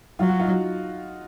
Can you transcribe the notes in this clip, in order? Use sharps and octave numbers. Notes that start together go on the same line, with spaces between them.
F#3 F4
F#4
D#4 F4